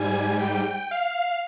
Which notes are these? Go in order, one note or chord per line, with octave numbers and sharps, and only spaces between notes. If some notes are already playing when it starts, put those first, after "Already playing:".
Already playing: G#2 G3 G#5
G5
F5